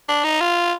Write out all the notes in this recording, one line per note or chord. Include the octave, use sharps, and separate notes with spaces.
D4
D#4
F4